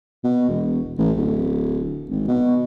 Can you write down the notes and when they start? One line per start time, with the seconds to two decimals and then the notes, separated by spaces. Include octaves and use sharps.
0.24 B2
0.48 E1
0.98 A1
1.17 D1
2.10 G#1
2.28 B2